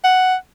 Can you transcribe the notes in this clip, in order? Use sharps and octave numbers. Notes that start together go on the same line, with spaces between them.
F#5